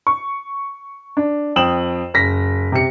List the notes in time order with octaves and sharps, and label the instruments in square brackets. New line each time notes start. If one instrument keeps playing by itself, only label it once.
[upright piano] C#6
D4
F2 G5 D#6 E7 F#7
F#1 A#6 B6
C3 C#7